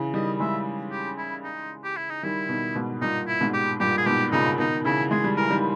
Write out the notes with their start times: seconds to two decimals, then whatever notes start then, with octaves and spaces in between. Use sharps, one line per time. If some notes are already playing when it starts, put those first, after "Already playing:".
Already playing: C#3 E3
0.14 D#3 G3 D#5
0.40 E3 G#3 E5
0.92 G4
1.18 E4
1.44 D#4
1.84 G4
1.97 E4
2.10 D#4
2.23 D#3 G3 E4
2.49 B2 D#3
2.75 G#2 B2
3.01 G2 A#2 D#4
3.28 E4
3.40 G#2 B2
3.53 G4
3.80 G2 A#2 G4
3.97 G#4
4.06 G#2 B2 G4
4.32 A#2 C#3 D#4
4.58 B2 D#3 D#4
4.85 C#3 E3 E4
5.11 G#3 G#4
5.24 G3
5.37 E3 A#4
5.50 D#3 G3